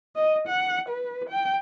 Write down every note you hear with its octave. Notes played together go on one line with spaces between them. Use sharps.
D#5
F#5
B4
G5